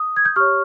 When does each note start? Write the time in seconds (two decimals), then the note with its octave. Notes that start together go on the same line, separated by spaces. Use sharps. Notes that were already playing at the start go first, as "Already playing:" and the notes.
Already playing: D#6
0.17 G#6
0.25 G6
0.36 G4 C#5 C#6 F6